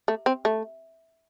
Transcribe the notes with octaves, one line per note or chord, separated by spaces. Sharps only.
A3
C4
A3